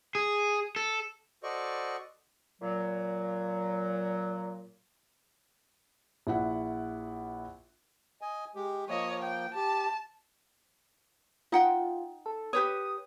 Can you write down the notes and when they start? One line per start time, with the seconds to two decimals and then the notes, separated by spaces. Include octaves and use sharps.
0.15 G#4
0.76 A4
1.43 F#4 A4 C5 D5 D#5 C#6
2.62 A#2 F#3
6.27 A#1 E4 F#5
8.21 D#5 G#5
8.55 G#3 G4
8.89 F3 A#3 C#5 D#5
9.23 G5
9.55 G4 A5
11.52 D#4 F4 F#5 G5
12.26 A4
12.53 G4 B4 C#5 D#6